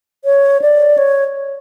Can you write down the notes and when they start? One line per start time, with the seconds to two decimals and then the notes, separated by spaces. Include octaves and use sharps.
0.25 C#5
0.62 D5
0.98 C#5